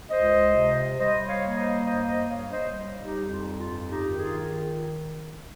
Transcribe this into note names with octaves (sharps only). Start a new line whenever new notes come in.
C#2 C5 D#5
C3
G3 C5 D#5
C#5 F5
A#3
C5 D#5
G2 C5 D#5
C5 D#5
G3 C#5 F5
C5 D#5
G3
D#4 G4
F2
F4
G2 F4
D#4 G4
D#3
F4 G#4